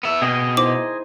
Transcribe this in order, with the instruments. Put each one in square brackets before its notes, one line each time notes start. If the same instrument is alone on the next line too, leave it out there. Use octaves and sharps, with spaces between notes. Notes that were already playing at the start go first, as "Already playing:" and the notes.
[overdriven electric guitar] B3 E5
[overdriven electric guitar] B2 [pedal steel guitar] G#4 D#5 G5
[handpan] D#4 E4 C5 [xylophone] D6